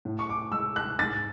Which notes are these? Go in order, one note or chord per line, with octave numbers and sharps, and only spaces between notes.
A2
C#6
D6
G#3 E6
F#6
G#2 A6